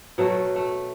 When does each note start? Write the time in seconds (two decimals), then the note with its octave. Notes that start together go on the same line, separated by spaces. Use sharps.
0.18 B2 F#3 A3
0.56 A3